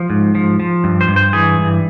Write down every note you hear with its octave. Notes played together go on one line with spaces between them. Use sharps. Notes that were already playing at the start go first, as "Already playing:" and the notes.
Already playing: F3
G#2
F3
F3
G2
C5
G2
C5
E3 G#4
G2